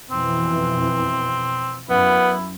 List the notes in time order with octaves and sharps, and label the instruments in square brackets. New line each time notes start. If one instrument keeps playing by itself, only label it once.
[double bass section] F2 B2 E3 [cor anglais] C4
[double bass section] F#2 [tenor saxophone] B3 [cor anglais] E4